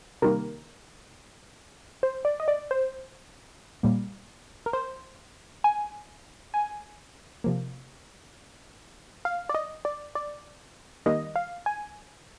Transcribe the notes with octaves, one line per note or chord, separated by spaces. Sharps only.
C3 D#3 G3 A#3 A#4
C5
D5
D#5
D5
C5
A#2 G3 A#3
A#4
C5
G#5
G#5
C3 F3 A#3
F5
D5
D#5
D5
D5
D#3 G3 A#3 D#5
F5
G#5